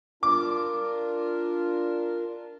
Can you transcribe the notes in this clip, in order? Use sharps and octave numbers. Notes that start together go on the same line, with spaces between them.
D4 F4 A#4 D6